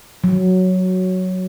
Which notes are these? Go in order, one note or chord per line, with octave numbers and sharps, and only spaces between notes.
F#3